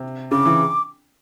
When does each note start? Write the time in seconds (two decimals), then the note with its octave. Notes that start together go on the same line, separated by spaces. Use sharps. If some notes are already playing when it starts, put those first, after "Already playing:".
Already playing: C3
0.31 C#3 D6
0.46 E3